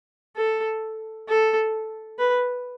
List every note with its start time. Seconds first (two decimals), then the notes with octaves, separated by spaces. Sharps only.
0.36 A4
1.29 A4
2.19 B4